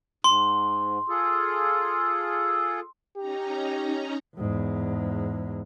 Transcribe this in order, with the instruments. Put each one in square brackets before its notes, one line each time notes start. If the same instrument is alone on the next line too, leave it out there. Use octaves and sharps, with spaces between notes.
[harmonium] G#2 [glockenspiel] C6
[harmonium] F4 G#4 A4
[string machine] C#4 D#4 A#5 [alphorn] G4
[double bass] E2 G#2